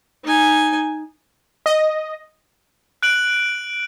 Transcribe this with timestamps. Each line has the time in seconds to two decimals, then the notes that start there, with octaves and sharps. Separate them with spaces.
0.25 D#4 G#5
1.66 D#5
3.03 F#6 D7 F#7